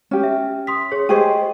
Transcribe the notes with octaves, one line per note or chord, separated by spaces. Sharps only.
C#4 G4
E5
C6 D#6 B6
G#4 C#5
G4 G#4 C5 D#5 C#6 D#7